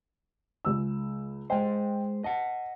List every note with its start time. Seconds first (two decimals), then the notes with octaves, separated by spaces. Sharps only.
0.65 C#2 E6
1.50 G#3 C5 D#5 G5
2.24 D#5 F#5 A5